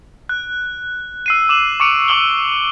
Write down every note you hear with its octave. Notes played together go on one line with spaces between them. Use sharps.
F#6
E6 C7 D#7
D6 E7 F#7
C#6 D6 C#7 D7 F7
C#6 D6 E6 F#7 G7